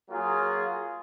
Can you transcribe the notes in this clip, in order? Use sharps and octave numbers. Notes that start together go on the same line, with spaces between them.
F#3 A#3 F4 G#4